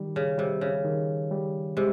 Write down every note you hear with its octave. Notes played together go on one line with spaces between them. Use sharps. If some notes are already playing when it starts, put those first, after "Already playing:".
Already playing: D#3 G3
C#3
C3 G3
C#3
D#3
G3
C3 G#3